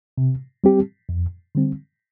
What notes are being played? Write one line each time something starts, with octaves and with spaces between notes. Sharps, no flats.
C3
G3 C4 G4
F2
D3 G3 C4